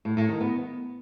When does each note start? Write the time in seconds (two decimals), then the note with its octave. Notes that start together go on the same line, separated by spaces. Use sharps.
0.05 A2
0.17 A2
0.29 D#3
0.41 B3